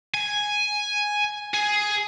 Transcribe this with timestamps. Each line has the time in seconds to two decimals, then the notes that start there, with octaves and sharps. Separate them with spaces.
0.14 G#5
1.54 G#4